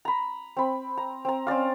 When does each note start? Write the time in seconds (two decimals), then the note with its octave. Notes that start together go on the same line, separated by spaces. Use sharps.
0.05 A#5 B5
0.57 C4 B5
0.97 A#5
1.25 C4 A#5
1.47 C4 C#4 D5 F5